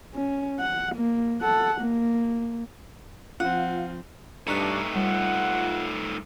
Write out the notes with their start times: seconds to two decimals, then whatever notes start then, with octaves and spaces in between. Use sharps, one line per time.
0.15 C#4
0.60 F#5
0.95 A#3
1.41 A4 F#5
1.81 A#3
3.40 F3 C4 F4 F#5
4.48 G2 A3 D4 D#4 A#5 C#6 F#6
4.96 G3 F4 F#5